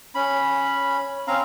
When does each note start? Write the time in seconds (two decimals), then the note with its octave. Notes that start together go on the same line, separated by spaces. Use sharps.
0.15 C#4 B5
1.27 C4 C#4 F5 A#5